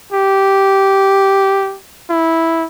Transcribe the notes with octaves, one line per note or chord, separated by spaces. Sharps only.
G4
E4